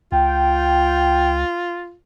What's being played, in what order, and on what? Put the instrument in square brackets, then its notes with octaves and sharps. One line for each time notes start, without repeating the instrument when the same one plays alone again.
[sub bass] C#2 [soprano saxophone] F4 [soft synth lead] G5